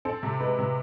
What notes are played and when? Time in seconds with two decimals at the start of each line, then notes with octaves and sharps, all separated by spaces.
0.05 C4 A4
0.23 C3
0.40 G#3 B4
0.59 C3